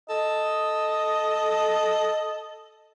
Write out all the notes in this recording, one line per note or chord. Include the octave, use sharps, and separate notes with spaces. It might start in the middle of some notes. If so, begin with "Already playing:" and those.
A4 D#5